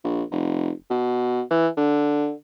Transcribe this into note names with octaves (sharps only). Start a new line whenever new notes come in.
A#1
F1
B2
E3
D3